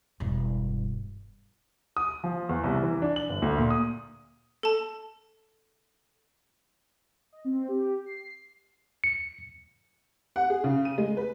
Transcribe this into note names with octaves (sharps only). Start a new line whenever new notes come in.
E1 G2
D#6
F3
E2
C2
E3
D4
F#7
G1
D2
A#2
D#6
A4 A5
D#5
C4
G4
C7
C#7
F#5
G#4
C#3
D#7
G#3
B4